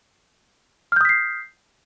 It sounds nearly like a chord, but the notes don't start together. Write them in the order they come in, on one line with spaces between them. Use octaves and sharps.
F6 G6 D#6 B6 C7